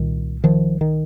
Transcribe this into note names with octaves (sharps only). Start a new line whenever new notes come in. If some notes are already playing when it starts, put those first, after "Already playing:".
Already playing: C2 A#2 D#3
D#3 F3
D#3